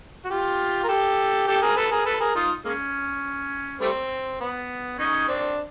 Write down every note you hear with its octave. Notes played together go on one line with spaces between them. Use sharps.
F#4
F4 G4
A#4
G4 A4
G4 A4
G#4 A#4
A4 B4
G#4 A#4
A4 B4
G#4 A#4
D#4 F4
G#3 A#3 C#4
G3 A3 C4
B3
C#4 D#4
C4 D4